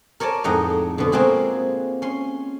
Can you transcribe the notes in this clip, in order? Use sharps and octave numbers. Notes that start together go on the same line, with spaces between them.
A#4 C#5 D5 G#5 A5
F2 A2 G#3 D#4 F#5 A#5
B2 D3
G#3 A#3 C4 F4 F#4 G#4
C#4 C6